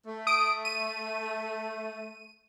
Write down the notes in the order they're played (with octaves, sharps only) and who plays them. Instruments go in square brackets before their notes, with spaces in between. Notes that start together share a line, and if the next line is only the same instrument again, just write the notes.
[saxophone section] A3
[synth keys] D#6 D7
D#7